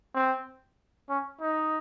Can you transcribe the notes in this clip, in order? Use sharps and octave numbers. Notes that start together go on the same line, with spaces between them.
C4
C#4
D#4